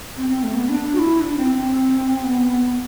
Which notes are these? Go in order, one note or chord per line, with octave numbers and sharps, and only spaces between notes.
C4
C4
A3
B3
D4
F#4
E4
D4
C4
C4
B3